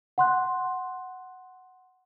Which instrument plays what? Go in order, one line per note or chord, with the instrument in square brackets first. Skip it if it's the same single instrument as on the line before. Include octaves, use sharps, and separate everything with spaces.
[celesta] F#5 C6 F#6